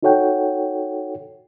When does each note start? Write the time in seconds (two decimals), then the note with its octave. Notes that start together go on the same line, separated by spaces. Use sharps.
0.03 D#4 F#4 A4 C#5 F#5 G5